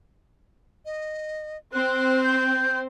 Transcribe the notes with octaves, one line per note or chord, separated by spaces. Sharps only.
D#5
C4 C5 F#6
G6